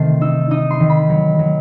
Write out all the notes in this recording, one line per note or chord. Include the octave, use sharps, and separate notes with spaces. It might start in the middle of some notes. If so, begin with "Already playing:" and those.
Already playing: C3 D#3 A3 G5 A5 C6
D#4 E6
D#4 D#6
C6
D#3
B5
F#3
F#3